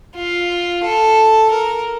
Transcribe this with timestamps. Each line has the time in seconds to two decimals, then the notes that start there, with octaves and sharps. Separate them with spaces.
0.16 F4
0.84 A4
1.51 A#4